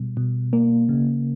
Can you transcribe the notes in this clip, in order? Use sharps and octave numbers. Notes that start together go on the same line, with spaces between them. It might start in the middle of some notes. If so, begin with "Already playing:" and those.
Already playing: B2 G3
B2
A#3
C#3